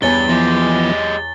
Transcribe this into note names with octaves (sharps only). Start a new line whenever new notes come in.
E2 G2 C#5 G#5 A6 G7
E3 F3 G#3 B3 G4